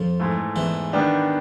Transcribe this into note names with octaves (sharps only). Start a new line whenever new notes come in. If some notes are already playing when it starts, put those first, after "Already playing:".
Already playing: F2 F3
G#2 E3 A3
E2 E3
D#3 G3 B3 D4 G4